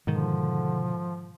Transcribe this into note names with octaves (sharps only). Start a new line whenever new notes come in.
G#2 B2 D3 D#3 F3